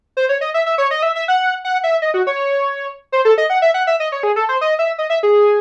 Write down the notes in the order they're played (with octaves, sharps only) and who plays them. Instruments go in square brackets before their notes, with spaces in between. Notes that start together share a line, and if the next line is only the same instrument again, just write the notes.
[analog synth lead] C5
C#5
D#5
E5
E5
C#5
D#5
E5
E5
F#5
F#5
E5
D#5
F#4
C#5
C5
A4
D#5
F#5
E5
F#5
E5
D#5
C#5
G#4
A4
C5
D#5
E5
D#5
E5
G#4